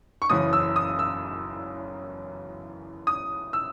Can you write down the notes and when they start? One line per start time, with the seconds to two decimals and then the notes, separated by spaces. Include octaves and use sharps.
0.22 C#6
0.30 F#1 F#2 C#3 E3 D#6
0.53 E6
0.76 D#6
0.99 E6
3.07 D#6
3.53 E6